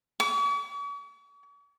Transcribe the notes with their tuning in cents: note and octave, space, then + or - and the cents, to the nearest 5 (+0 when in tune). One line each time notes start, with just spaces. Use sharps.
C#6 +45